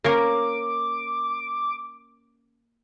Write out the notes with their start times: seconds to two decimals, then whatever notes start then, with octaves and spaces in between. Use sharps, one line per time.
0.04 A#3 C#4 A#4 D6